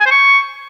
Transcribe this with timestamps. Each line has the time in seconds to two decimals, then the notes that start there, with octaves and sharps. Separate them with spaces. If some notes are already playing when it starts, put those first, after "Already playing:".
0.01 G#5
0.06 C5
0.11 C#6